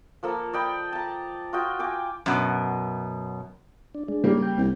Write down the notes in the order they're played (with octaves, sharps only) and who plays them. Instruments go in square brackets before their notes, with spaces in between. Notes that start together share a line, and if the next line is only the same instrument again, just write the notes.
[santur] F3 A#3 A4
D5 D#5 G5 B5
A5 A#5
F4 F#4 D#5 G5
G5 G#5 D6
[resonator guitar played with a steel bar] F#2 B2
[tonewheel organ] D4
G#3 D4
[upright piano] C#3 G3 A#3
[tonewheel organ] G5
[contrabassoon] C2